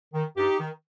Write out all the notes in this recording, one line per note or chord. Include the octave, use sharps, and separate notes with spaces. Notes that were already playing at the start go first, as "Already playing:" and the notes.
D#3
G2 D#4 G4
D#3